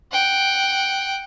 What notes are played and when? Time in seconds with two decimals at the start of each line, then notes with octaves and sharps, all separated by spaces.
0.12 F#5 G5